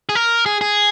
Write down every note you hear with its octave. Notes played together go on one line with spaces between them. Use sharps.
G#4
A#4
G#4
G#4